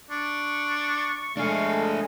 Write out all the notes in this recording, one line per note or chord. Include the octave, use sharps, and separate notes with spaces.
D4 C#6
G#3 A3 D4 G#4 F5